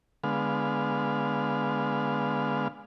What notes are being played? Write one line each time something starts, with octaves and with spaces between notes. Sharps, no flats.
D3 G#3 B3 F5